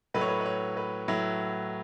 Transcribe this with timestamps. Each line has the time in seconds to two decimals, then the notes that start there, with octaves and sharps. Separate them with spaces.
0.14 A2 F#3 A3 B4
0.21 C#5
0.28 B4
0.41 B4
0.46 C#5
0.77 B4
1.08 A2 F#3 A3 E4